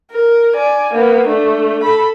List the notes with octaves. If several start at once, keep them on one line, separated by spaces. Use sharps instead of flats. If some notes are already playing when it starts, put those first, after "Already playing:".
A#4
D5 G#5
A#3 B3
A3 D4
A4 B5